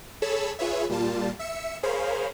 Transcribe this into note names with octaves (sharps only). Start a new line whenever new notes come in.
G#4 A4 C#5 A5 B5 E6
F4 G#4 B4 C#5 E5
A#2 G3 F4 A5
E5 E6 C#7
G#4 A#4 C5 C#5 F5 B5